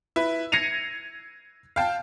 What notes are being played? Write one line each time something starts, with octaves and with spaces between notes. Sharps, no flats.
E4 B4
G#6 A#6 C7 C#7 D#7 F7
F5 G5 A5